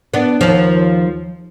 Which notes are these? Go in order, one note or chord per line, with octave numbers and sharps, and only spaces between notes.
B3 D4
D#2 F3